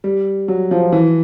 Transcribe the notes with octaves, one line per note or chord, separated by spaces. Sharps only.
G3
F#3
F3
E3